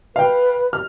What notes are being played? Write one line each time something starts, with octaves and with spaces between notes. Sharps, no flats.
B4 F5 G5
F6